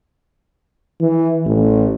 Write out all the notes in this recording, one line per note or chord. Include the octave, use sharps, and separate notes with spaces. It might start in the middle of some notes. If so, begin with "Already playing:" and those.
E3
A1